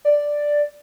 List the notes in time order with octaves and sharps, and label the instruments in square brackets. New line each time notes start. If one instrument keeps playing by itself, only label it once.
[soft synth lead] D5